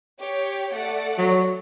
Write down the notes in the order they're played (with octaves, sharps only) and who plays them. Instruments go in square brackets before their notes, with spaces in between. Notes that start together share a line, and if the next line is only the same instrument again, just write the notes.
[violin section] G4 C#5
A3 D5 F#5
[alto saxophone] F#3